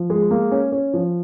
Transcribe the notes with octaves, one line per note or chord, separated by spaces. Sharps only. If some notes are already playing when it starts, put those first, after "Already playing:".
Already playing: F3
G#3
A#3
C#4
C#4
F3